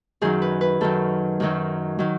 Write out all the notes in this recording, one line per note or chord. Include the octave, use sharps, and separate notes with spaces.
F#2 D#3 F#3 G#4
B4
B4
F#2 D#3 F#3 A4
F#2 D#3 F#3
D#3 F#3